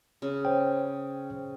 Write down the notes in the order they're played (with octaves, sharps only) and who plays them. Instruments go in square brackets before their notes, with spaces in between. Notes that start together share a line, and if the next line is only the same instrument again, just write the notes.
[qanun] C#3
[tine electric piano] C5 G5